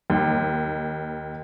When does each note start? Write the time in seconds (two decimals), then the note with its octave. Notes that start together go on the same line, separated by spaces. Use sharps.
0.10 D#2